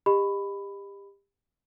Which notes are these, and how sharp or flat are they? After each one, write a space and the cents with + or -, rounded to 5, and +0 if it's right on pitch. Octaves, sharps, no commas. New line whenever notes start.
G4 +25 D#5 -15 B5 +10